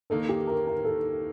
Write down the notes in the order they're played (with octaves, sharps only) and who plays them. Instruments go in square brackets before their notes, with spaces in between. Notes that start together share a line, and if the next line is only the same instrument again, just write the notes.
[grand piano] D#2 D#3 A#3 D#4 [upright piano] A4
[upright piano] G4
A#4
A#4
A4